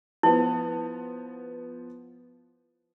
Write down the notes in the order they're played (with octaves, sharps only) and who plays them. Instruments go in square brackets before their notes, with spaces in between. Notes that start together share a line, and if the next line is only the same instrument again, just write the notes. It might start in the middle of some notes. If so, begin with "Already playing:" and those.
[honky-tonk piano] F3 B3 [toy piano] E4